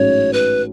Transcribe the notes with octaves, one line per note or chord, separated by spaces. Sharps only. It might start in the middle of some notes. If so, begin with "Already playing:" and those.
Already playing: A1 G#2 F#3 C#4 C#5
B4